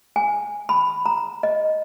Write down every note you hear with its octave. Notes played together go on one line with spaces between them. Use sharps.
G#5
B5
A#5
D#5